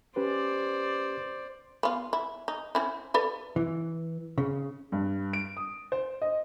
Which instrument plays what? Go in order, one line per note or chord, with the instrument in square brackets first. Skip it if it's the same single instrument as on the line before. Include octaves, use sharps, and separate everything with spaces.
[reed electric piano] C#4 G4 B4 [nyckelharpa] C5 D5
[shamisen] B3 F4
E4
D#4
C4 C#4 E4
A4 B4 D5
[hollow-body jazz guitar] E3
C#3
[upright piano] G2
D7
D#6
C5
D#5